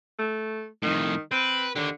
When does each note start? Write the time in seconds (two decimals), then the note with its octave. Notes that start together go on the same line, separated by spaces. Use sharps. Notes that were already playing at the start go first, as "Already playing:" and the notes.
0.18 A3
0.83 F2 A2 D#3
1.31 C4 B4
1.75 D3 D#3 G4